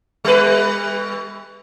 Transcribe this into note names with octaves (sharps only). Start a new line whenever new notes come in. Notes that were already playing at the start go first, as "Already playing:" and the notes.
G3 B4